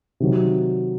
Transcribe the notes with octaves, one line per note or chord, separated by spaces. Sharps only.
C3 D#3 F#3